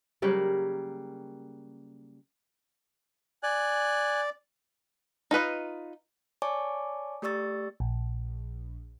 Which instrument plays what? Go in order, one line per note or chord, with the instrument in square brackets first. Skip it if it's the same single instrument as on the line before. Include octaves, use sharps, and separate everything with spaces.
[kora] C#3 F#3 G3 A#3
[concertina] D5 [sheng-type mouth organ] G#5 F#6
[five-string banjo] D#4 F4 B4 D#5
[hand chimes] C#5 D5 G#5 A5 C#6 D6
A3 G4 D5 C#6 E6 A6
[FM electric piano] A#1